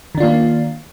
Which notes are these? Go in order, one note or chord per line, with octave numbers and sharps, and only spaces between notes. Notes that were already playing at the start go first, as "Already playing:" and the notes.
D#3 A#3 D4 F4